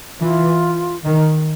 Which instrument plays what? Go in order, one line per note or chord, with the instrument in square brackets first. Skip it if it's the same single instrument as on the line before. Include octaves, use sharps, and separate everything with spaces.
[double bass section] E3 [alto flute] F4
[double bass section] D#3